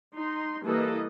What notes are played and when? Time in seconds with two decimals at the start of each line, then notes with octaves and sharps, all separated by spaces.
0.15 D#4 C6
0.64 E3 G3 A#3 A4 B4 D#5